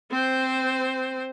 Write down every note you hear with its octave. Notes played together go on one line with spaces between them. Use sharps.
C4 C5